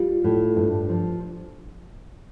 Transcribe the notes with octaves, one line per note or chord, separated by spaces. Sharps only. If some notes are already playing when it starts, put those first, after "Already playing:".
Already playing: G3 F4
A2
G2
F3